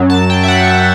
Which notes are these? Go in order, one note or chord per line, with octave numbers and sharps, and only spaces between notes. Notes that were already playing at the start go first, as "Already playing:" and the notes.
Already playing: F#2 F#3
A5
G5
E5
F#5
E5